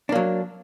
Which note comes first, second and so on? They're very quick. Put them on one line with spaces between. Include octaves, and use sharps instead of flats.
D4 A#3 F#3